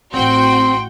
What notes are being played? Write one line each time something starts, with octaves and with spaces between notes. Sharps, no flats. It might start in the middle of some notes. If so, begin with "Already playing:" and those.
A1 C4 F#4 G5 C6